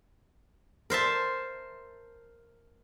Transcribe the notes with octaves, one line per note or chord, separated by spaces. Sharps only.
A#4 C5 E5 A5